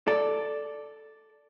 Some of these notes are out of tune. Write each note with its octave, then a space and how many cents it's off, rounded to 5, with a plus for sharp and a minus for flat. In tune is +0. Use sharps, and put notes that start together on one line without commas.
A4 +0 D5 +0